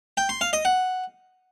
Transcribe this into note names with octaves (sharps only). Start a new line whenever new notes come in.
G5
C6
F5
D#5
F#5